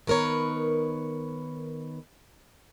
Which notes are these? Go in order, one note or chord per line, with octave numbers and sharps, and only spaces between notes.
D#3 B3 A#4 B4 C#5